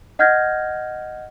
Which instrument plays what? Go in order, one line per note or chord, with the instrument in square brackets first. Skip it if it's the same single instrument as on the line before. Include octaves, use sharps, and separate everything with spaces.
[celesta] D#5 F#5 F6 G6 G#6 A#6